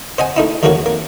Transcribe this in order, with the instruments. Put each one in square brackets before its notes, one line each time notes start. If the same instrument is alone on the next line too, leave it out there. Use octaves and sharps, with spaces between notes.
[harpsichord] C5 D#5 F#5 G#5
A3 D#4 E4
D#2 F3 A3 A#3 F#4 C#5
A#3